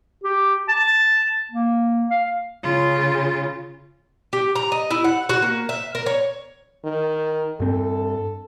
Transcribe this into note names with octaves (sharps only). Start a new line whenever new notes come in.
G4
A5
A#3
F5
C#3 F4
G4
A#5
D#5
E4
F#5
F#4
A#3
E5
A#4
C#5
D#3
G2 C4 A4